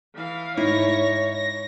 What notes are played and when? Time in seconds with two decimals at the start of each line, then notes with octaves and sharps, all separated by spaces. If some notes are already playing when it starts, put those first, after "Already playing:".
0.15 E3 F5
0.57 G#2 D#4 E4 C#5 A#6
1.33 A#6